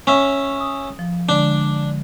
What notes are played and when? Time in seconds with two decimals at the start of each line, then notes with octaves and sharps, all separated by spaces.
0.07 C#4 E5
0.60 D#6
0.99 F3
1.29 D3 G#3 D4